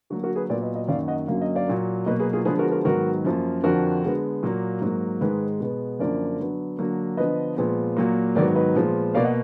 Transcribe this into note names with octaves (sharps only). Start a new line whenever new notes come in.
D3 F#3 A#3 F#4
F#4 A#4
G#4 B4
A#2 F#3 B3 A#4 D5
B4 D#5
B4 D#5
F#2 D#3 F#3 A#3 D5 F5
D#5 F#5
F#2 D3 F#3 A#3 F5
D#5
D5 F5
A#2 F#3 A#3
B2 F#3 A#3 B4 D#5
G#4 B4
F4 G#4
D3 F3 G#3 B3 G#4 B4
F#4 A#4
F#4 A#4
G#2 D#3 F#3 B3 F#4 A#4
F#2 F3 A#3
F2 D3 F3 F#4 A#4
D3 G#3 B3
A#2 F#3 A#3
G#2 F#3 A#3
G#2 D#3 G#3 G#4 B4
B2 G#3 B3
F#2 D3 F3 A#3 A#4 D5
D3 F#3 B3
D3 F#3 A#3
D3 F3 B3 B4 D#5
A#2 F3 G#3 B3
A#2 F#3 A#3
G#2 D#3 F#3 B3 A#4 D5
B4 D#5
A#2 F3 G#3 B3
B2 A#3 D5 F5
D#5 F#5